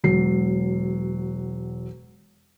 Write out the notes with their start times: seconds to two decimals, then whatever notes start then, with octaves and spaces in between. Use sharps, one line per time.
0.04 E1 F#3 C7